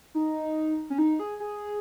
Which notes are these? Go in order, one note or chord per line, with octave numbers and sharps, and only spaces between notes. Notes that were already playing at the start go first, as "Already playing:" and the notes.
D#4
C#4
D#4
G#4
G#4